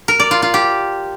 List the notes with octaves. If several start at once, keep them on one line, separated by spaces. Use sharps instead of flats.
A#4
D5
F4
F4
G4